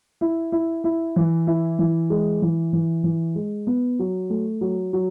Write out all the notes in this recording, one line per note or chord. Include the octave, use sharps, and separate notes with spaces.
E4
E4
E4
E3
E4
E3
G#3
E3
E3
E3
G#3
B3
F#3
A3
F#3
F#3